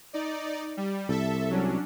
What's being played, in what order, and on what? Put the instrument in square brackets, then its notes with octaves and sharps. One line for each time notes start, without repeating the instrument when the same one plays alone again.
[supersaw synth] D#4 D5
G3
[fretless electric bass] C2 [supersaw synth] A4 E5
[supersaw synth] F#3 C#4 D4